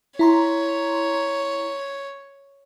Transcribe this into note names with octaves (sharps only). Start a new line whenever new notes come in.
E4 C#5 A#5 C6